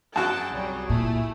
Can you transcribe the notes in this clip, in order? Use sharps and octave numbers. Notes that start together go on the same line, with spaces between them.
F#2 F#4 G#4 G5 A5 F#6
C2 F#3 G3
A#2 A3 E4